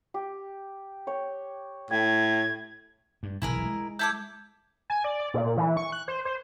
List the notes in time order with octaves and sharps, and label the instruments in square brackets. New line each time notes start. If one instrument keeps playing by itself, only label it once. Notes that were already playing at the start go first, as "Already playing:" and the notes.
[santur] G4
C#5 G5
[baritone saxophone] A2 [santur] G5 [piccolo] G#6
[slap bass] G2
[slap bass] F1 B1 E3 [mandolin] E4 G#4 A#4
[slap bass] G#3
[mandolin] E4 A4 D6 [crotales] G6 G#6
[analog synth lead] G#5
D5
D5
A#2
E3
C#6
F#6
C5
C5